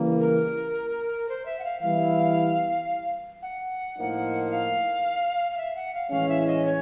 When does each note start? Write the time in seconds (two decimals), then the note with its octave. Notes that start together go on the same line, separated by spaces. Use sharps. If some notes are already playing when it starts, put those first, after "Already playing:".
Already playing: C#3 E3 G3 A#3
0.21 A#4
1.29 C5
1.45 E5
1.59 F#5
1.64 F5
1.81 E3 G3 B3 E4 F5
3.42 F#5
3.96 A2 F3 A#3 D#4
4.50 F5
5.51 F5
5.57 E5
5.76 F#5
5.94 F5
6.11 A2 E3 G#3 C#4 F5
6.28 E5
6.47 D#5
6.65 C#5